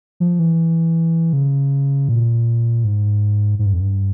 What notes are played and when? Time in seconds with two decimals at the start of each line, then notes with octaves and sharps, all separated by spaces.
0.20 F3
0.39 E3
1.33 C#3
2.09 A#2
2.84 G#2
3.59 G#2
3.66 G2
3.73 F2
3.80 G2